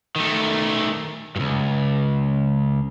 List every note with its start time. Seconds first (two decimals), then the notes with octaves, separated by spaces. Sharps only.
0.16 D#3 A3
1.36 C#2 G2